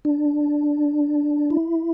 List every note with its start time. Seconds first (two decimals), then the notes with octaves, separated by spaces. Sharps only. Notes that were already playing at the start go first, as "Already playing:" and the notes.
0.05 D4
1.50 E4